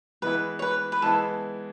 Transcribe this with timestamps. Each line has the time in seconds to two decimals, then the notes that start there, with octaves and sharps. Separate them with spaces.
0.22 E3 G#3 B3 E4 B4
0.59 C#5
0.62 B4
0.92 B4
1.02 E3 G#3 B3 E4 A4